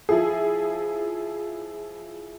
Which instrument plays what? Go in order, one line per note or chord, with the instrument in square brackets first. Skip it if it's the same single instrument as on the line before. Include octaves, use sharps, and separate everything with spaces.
[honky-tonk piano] F3 E4 G#4